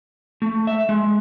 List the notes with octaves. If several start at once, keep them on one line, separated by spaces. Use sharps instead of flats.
A3
E5
G#3